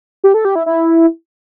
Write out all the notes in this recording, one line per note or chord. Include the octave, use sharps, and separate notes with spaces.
G4
A4
G4
E4
E4